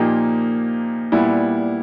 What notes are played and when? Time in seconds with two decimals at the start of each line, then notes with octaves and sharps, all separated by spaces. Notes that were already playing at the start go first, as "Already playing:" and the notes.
Already playing: A#2 F3 A#3 D#4 G4
1.12 A#2 G3 B3 E4